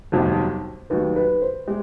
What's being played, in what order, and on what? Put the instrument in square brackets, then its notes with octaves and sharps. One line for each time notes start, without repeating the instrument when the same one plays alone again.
[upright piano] G1 F2 C3 D#3 F#3 [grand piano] C5
[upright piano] D#2 D#3 F#3 [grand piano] B4
[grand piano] B4
C5
[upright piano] G#3 [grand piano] G4